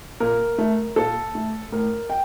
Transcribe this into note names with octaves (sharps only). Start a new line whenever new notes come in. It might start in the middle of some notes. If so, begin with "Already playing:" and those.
A#2 A#4
A3
A#2 A4
A3
A2 A#4
G5